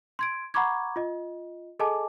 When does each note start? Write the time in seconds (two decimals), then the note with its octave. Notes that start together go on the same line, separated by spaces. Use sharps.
0.19 C6 G#6 D7
0.54 F#5 A#5 B5 C#6 D6 G#6
0.96 F4 D#5
1.80 G#4 A4 D#5 G#5 A5 D6